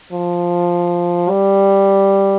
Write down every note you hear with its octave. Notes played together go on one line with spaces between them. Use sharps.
F3
G3